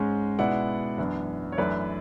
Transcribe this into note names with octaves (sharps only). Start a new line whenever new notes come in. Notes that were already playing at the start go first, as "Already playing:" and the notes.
Already playing: G#2 G#3 C#4
B2 G#3 B3 E4 D5 F#5
F#2 E3 B3 D4
C#5
F#2 E3 A3 D4 B4 D5